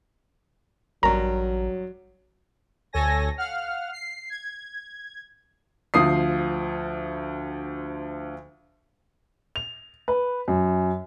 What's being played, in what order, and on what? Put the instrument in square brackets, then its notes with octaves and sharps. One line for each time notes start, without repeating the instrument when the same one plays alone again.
[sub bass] A1 [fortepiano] G2 A#4 [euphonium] F#3 [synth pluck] A#5
[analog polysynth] D2 A4 C#5 G#5 A#6
F5 F#5 F6
C7
G#6
[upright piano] D2 F3 D#6 C7
[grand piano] F7
B4
F#2